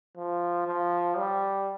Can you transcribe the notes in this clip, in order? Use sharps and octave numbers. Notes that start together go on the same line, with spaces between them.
F3
F3
G3